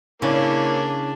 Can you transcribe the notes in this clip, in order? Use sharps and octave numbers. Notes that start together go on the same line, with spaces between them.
C#3 A#3 C#4 D4 E4